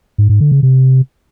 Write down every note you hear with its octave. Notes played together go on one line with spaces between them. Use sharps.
G#2
G#2
D3
C#3
C3